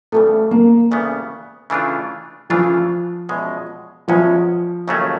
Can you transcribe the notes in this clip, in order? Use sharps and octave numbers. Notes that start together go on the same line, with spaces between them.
D2 C#3 E3 G3 A3 B3
A#3
D2 C#3 E3 G3 B3
C#3 E3 A3 D4 F4
C#3 E3 F3 A3 D4 F4
E2 B2 G#3 C#4
E2 B2 F3 G#3 C#4
D#2 C#3 F#3 A3 C#4